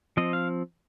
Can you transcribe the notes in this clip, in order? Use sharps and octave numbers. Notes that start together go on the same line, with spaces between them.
F3 C4 D#5
F5